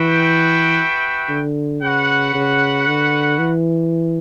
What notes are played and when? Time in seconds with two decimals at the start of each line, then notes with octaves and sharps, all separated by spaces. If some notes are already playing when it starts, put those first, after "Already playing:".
Already playing: E3 F#4 B4 E5 G5
1.29 D3
1.82 C#3 F#4 B4 F#5
2.34 C#3
2.87 D3
3.38 E3